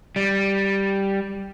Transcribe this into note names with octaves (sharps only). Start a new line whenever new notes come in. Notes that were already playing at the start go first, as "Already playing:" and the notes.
G3